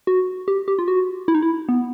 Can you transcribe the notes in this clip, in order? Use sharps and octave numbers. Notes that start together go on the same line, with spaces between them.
F#4
G4
G4
F4
F#4
E4
D#4
E4
B3